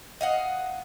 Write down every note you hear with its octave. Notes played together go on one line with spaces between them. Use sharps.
D#5 F5 F#5